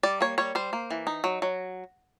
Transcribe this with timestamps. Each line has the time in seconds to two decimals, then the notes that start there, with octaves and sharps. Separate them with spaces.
0.03 G3 D5
0.21 A#3 C#5
0.38 G3 C#5
0.55 G3 C5
0.73 A#3
0.91 E3
1.07 D#4
1.24 F#3
1.42 F#3